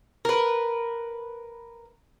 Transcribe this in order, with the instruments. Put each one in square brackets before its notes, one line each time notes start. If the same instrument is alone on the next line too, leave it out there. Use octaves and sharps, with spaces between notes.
[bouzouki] A#4 B4